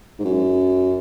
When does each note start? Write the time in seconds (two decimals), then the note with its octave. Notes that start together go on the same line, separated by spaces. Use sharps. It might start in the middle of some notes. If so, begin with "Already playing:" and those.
0.20 G#2
0.25 F#2